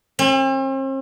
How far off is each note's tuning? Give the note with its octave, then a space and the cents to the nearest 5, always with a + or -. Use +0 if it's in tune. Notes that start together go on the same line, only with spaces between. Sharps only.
C4 +45